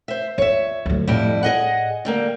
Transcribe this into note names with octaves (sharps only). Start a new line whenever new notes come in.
C5 E5
F4 C#5 E5
D2 F#3
F2 A2 G3 E4
G#4 D#5 F#5
D3 G3 A#3